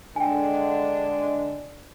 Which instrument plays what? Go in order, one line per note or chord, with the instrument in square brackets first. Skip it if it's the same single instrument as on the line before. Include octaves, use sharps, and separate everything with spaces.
[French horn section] D3 G#3 D4 [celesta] G5 G#5